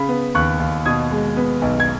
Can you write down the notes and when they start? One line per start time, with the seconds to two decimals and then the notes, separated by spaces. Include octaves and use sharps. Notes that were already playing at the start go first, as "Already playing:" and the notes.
Already playing: C#3 B5
0.09 B3
0.35 D#2 C#6 F#6
0.60 D#2
0.86 B2 D#6 G#6
1.11 G#3
1.37 B3
1.62 B1
1.80 G#6